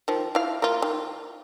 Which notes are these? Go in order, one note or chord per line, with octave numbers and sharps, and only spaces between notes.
D#3 F3
E4 F5
A#3 F4
D#3